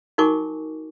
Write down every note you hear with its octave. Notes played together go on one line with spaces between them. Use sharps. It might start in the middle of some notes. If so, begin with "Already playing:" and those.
D#4 F#4 A#4 G#5 C#6 D6